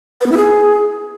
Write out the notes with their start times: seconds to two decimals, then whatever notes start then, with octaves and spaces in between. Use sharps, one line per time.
0.21 B4
0.26 B3
0.32 E4
0.37 G#4